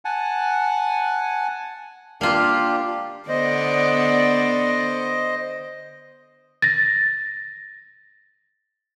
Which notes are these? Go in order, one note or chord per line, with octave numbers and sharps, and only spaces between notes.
F#5 G#5 A5
A#3 D4 F4 G4
D3 B3 C5 D5 D#5
A6 A#6